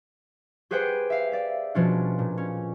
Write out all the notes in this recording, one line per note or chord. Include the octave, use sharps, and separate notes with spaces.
G4 G#4 B4 C5 F#5 G5
E5 F5
D5 E5
B2 F3 C#4 D4
A#2
C#4